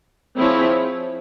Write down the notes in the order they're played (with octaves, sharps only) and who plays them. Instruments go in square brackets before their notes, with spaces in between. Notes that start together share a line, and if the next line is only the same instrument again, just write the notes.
[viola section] F3 C4 E4 G#4 C#5